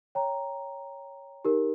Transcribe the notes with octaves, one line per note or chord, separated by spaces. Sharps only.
C#5 G5 A#5
D#4 G4 A#4